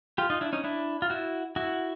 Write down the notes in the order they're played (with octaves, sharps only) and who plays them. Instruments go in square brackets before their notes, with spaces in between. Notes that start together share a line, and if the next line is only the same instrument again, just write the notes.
[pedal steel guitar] F4 G4
D#4 F4
D4 E4
C#4 D#4
D4 E4
F4
E4 F#4
E4 F#4